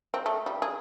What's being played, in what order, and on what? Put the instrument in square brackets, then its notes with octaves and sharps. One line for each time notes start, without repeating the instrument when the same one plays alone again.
[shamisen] C4
A3
G3
G#4